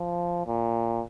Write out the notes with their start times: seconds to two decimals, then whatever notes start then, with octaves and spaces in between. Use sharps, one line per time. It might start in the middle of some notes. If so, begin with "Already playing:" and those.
Already playing: F3
0.46 A#2